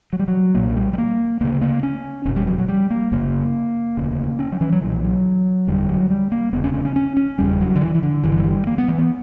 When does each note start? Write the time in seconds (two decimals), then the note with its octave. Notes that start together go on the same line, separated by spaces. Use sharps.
0.13 F#3
0.19 G3
0.28 F#3
0.54 B1 A#2 A#3
0.76 G3
0.93 G3
0.98 A#3
1.41 D2 C#3 A#3
1.61 A#3
1.83 C#4
2.25 F#1 E2 B2 C#4
2.36 G3
2.47 F#3
2.58 F#3
2.68 G3
2.90 A#3
3.11 F#1 F#2 C#3 A#3
3.97 E1 D2 C#3
4.39 C#4
4.52 F#3
4.61 E3
4.72 F#3
4.82 B1 A#2 E3
5.04 F#3
5.67 F#1 E2 D3 G3
5.89 F#3
6.10 G3
6.32 A#3
6.53 E1 D2 C#3 B3
6.64 C#4
6.74 C#4
6.85 C#4
6.96 C#4
7.17 C#4
7.38 F#1 E2 C#3 G3
7.61 F#3
7.75 D3
7.81 E3
7.95 E3
8.03 D3
8.23 G1 G2 D3 E3
8.39 F#3
8.46 G3
8.67 A#3
8.78 B3
8.88 E3
8.99 B3